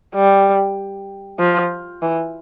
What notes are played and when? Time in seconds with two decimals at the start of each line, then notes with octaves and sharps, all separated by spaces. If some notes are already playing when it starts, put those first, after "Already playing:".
0.15 G3
1.39 F3
2.02 E3